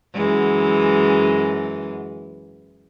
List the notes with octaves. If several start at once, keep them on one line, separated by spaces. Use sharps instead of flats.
F#2 E3 G#3